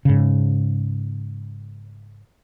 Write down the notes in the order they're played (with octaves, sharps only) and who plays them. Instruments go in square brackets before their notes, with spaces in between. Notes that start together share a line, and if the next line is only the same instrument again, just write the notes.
[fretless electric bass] G#2 C#3